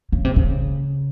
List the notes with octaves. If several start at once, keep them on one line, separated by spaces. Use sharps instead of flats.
C#3
C3
C#3